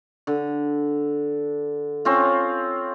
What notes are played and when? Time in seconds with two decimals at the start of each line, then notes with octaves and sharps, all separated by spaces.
0.27 D3
2.05 C4 C#4 F4